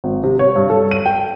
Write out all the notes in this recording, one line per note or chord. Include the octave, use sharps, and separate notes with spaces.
G#1
C3
C#5
G2
A4
D#7
G5